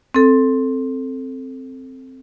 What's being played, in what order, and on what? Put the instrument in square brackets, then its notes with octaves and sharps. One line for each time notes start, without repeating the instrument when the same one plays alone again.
[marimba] C4 A4